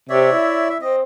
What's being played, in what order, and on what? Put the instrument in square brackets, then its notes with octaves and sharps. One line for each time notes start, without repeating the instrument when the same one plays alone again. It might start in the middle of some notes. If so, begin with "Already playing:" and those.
[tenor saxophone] C3 [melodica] C#5 D5 E5
[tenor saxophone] E4
[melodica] E5
[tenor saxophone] C4 [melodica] D#5